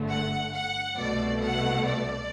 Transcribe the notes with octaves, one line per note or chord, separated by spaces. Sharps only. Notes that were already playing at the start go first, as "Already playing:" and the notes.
Already playing: G1 G2 D3 A3
F#5
F#5
C2 B2 A3 D5
F#5
D5